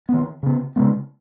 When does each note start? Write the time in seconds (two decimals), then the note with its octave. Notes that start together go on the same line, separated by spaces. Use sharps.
0.09 D#3 B3
0.43 C#3 B3
0.76 C#3 G#3 B3